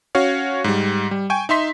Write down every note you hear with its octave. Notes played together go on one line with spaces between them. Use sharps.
C#4 F#4 C#5 F5
G#2 G3
G3
G5 G#5 C#6
D#4 E5 C6 B6